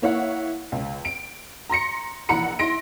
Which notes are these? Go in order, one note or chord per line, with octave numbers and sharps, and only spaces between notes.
A#3 E4 C#5 F5 F#5
C#2
D7
A#5 C6 A#6 C#7
A#1 E3 F#5 A#5 B5 C#7
E4 C6 A#6 D7